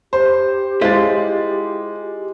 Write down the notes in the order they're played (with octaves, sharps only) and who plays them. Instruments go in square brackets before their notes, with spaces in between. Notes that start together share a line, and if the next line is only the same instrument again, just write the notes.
[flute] G4 [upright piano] C5
[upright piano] G#3 A6 [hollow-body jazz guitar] E4 F4 C5